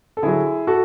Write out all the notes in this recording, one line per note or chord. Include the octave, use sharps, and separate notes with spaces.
A4
D3 F#3 E4 G#4
F#4 A4